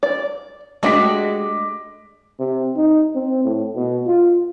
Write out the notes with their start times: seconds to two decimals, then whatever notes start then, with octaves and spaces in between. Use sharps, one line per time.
0.03 D5
0.83 G#3 A3 D4 F#4 G4 D#5 D6 B6
2.39 C3
2.76 D#4
3.15 C4
3.44 A2
3.75 B2
4.07 F4